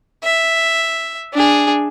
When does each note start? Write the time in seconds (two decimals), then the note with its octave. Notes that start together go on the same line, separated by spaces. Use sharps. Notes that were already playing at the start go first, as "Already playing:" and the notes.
0.24 E5
1.33 D4 G#4